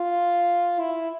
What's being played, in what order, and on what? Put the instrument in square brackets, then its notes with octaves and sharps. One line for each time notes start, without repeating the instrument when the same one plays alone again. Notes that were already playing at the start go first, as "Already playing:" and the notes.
Already playing: [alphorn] F4
E4